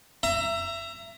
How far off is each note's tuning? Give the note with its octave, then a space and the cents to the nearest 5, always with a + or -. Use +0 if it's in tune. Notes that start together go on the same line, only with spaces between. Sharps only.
E5 +25 A#5 +0